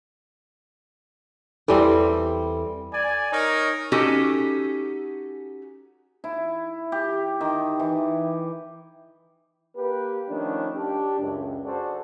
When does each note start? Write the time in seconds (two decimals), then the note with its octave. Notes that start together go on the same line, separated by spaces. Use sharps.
1.68 E2 E3 G3 C4 A4
2.94 D5 G#5
3.33 D#4 A#4 C#5
3.92 C#4 D#4 F#4 G4 A4
6.24 E4
6.92 G4
7.41 D#3
7.79 E3
9.76 A#3 G4 B4
10.29 D#3 F3 A3 C#4 D4
10.76 D4 G4
11.20 C#2 F#2
11.65 F#4 G#4 A4 C5 D5